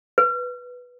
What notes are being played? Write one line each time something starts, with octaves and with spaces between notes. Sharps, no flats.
B4